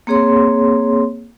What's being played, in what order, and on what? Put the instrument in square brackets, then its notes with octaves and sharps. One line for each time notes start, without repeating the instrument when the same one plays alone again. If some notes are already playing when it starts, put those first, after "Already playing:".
[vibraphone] A#3 C4 G#4 C#5 C6